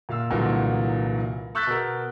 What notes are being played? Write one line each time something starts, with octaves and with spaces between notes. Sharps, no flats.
A#2 F5 E6
C2 A#2 D3 E3 F#3
C#6 E6 F#6 G6 A6 B6
B2 A#4